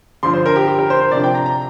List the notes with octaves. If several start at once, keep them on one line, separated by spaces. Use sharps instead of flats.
G2 D3 F3 D4 C6
C5
A#4
G4
G4
A#4
C5
C5
C3 F3 D4 D5
G5
A#5
A#5